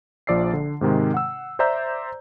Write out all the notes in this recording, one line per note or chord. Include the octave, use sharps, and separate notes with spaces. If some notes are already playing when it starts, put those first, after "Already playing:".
A#1 F3 D5 E6 C7
D3
G#2 C3 D#3 G#3
F#5 E6
C5 D5 E5 A#5 E6 G6